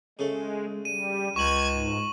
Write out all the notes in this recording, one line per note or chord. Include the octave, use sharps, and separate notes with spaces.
C#3 G#3 A3
G3 D#7
C#2 C#6 G#6 D#7 F#7
G#2